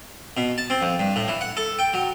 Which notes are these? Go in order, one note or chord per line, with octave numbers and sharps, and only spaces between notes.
B2
A5
C4
F2
G2
A2
E3
F#5
A4
G5
F#3